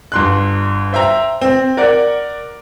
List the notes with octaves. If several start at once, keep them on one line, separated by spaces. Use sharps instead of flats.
G1 C6 F#6
C5 E5 G5 A#5
C4
A#4 D5 F#5